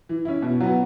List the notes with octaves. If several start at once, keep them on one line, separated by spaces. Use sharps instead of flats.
E3
C#4 E4
B2
F#3 B3